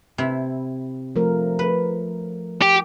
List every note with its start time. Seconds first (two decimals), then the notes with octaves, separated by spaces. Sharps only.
0.18 C3 E4
1.16 F3 A3 A#4
1.59 B4
2.62 G4